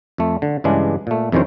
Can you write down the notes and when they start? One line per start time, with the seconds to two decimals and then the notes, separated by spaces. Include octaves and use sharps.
0.18 F2 A3
0.42 D3
0.64 G2 C#3 E3 G#3 D4
1.07 A#2 A3
1.32 F2 C3 D#3 E3 C#4 C5